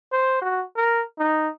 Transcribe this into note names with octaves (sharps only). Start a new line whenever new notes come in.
C5
F#4
A#4
D#4